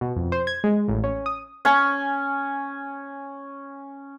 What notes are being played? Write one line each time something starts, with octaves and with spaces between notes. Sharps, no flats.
B2
F2
C5
G#6
G#3
A1
C#4
D#6
C#4 G#5 C#6